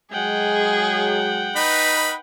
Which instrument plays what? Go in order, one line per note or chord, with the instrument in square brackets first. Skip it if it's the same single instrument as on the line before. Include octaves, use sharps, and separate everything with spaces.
[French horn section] F#3 G#3 [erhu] G#4 [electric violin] F#5 G5
[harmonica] D#4 B5 [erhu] B4